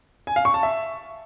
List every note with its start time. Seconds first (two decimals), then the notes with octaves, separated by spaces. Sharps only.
0.27 G#5
0.36 F5
0.45 C#6
0.54 A5
0.63 E5